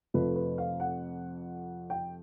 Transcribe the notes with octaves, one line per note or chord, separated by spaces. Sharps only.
F2 C3 F3 A3 B4
B4
F5
F#5
G5